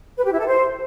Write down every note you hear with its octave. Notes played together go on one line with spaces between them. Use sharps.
B4
G4
E4
A4
C5